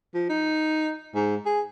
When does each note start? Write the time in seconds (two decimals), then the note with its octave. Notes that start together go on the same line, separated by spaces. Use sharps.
0.14 F3
0.29 D#4
1.15 G#2
1.45 G#4